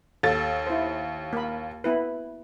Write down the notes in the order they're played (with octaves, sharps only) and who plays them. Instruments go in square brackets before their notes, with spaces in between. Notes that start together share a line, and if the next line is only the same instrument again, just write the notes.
[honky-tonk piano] D#2 A6 [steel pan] A4
[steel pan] E4 C5
A#3 B5
B3 E4 B4